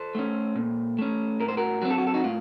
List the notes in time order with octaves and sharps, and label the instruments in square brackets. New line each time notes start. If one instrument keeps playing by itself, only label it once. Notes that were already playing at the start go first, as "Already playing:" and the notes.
Already playing: [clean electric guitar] A4 C5
A3 C#4
A#2
A3 C#4
A2 A#4
C5
F#4 A#4
F#3 C4 F#4
A4
F#4
A4
D#4 F#4
A2 F4